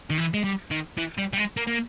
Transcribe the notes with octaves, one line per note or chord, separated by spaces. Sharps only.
D#3
E3
G#3
G3
D#3
E3
G3
G3
G#3
A#3
A#3